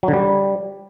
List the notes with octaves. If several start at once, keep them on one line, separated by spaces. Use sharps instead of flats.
F#3
D3
G3